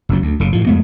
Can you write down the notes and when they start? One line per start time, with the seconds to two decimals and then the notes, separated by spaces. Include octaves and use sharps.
0.09 F#1 E2 F#3
0.22 D2
0.40 F#1 C#3
0.53 A2 F3
0.66 F2 G#3 A3 B3